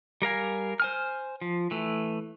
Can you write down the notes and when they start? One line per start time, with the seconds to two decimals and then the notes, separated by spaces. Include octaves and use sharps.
0.22 G3 A#4 F5 G#5
0.80 C5 G#5 F6
1.41 F3
1.71 E3 A3